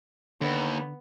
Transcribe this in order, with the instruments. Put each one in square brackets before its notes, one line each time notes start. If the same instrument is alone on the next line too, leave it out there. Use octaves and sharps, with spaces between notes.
[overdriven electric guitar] D#2 [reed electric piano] D3 [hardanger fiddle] B3